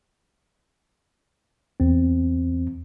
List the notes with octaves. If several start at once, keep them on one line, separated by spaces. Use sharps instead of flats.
E2 C4